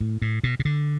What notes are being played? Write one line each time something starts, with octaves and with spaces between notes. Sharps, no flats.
A2
A2
B2
C3
D3